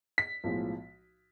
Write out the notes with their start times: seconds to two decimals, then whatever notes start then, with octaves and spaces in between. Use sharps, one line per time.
0.18 B6
0.44 B1 A2 F3 G#3